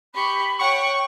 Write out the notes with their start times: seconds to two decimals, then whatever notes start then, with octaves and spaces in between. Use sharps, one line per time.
0.14 G4 B5 C#6
0.59 C#5 F#5 G5 C#6